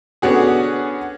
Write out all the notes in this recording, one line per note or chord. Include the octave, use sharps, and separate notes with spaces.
D3 B3 C#4 F#4 G#4